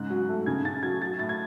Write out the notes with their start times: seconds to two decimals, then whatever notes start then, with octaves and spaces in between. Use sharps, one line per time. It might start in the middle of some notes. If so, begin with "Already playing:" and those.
Already playing: G#2 C#3 F#6
0.10 F#3
0.29 A3
0.46 C#3 G#6
0.64 C#3 A6
0.83 F#3 G#6
1.00 F#3 A6
1.19 A2 A6
1.29 G#6